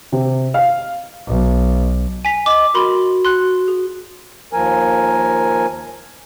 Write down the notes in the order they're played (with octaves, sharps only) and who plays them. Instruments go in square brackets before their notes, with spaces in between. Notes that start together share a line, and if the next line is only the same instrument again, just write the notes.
[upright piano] C3
F5
[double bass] B1
[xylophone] G#5 B6 F7
[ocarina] D#5 [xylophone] D6
[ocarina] F#4 [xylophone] A#4 B5 C6
[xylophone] C6 F#6
G#4
[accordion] D#2 F3 A#4 G#5